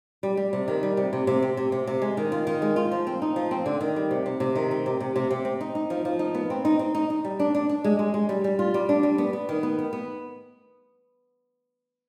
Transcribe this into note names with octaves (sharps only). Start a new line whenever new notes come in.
G3
G3
C3
D#3
G3
C3
C3
C3
C4
C3
C3
C3
G#3
D#3
F4
D#3
G#3
F4
F3
C4
D#4
F3
C4
D3
D#3
G3
C3
C3
C3
D#3
C4
C3
C3
C3
C3
C4
D#4
D#4
F3
F3
D#4
B3
C4
D#4
C4
D#4
D#4
G3
D4
D4
D4
G#3
G#3
G#3
G3
G3
F4
G3
D4
G3
B3
B3
D#3
B3
B3
B3